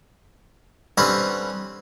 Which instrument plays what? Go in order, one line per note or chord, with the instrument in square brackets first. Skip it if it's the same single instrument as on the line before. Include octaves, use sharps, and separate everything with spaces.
[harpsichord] D3 G3 C4 C#4 B4 D#6